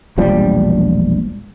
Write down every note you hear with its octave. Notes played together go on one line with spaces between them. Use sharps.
E1 A#1 F3 G3